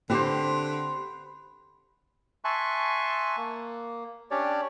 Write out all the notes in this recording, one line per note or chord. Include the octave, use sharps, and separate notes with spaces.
D3 C4 G4 B4 C5
E5 G#5 A5 C6 C#6 F#6
A#3
C#4 D4 G4 C#5 D5